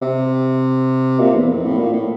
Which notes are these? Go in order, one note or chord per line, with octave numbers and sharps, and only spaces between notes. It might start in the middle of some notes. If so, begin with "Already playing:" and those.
C3
A#2
E2
F2
A2
A#2
A2